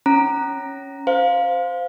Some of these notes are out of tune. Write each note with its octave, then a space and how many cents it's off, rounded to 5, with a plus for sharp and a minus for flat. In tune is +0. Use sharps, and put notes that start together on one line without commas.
C#4 +0 A#5 +0
C5 -10 F5 +10